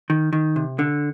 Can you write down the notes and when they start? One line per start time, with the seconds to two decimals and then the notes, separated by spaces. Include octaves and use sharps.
0.10 D#3
0.33 D#3
0.56 C3
0.79 D3